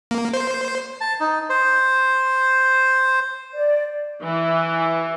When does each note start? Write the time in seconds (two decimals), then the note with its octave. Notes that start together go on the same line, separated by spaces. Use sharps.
0.11 A#3
0.34 C5
1.01 A5
1.20 D#4
1.50 C5
3.55 D5
4.24 E3